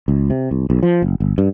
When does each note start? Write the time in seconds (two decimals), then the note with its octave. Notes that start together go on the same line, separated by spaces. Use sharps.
0.08 C#2
0.30 C3
0.51 C2
0.70 B1
0.83 F3
1.02 F#1
1.20 G1
1.38 G2